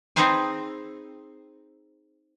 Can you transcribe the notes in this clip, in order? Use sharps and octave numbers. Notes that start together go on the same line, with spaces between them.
C4 D#4 G#4 B4 C5 G#5